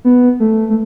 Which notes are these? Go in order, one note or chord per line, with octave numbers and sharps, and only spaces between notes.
B3
A3
A3